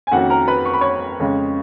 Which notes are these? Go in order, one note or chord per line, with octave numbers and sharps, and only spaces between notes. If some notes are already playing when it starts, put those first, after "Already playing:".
G#5
F2 D#3 A#3 C#4 F#4 F#5
A#4 A#5
B4 B5
C#6
B5
C#5 C#6
F2 C#3 G#3 C#4